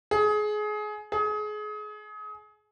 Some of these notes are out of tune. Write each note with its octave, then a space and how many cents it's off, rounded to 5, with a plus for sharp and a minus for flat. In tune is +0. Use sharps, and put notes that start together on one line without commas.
G#4 +25
G#4 +30